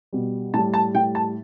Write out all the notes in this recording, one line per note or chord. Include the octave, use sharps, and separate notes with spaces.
B2 G3
A2 G3 A5
A5
A2 G3 G5
A5